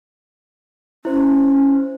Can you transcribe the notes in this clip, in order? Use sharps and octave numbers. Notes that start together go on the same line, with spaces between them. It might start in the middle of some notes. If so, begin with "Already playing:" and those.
C#4 E4 C5